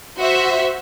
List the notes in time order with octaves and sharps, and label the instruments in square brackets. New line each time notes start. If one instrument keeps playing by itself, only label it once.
[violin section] F#4 C5 E5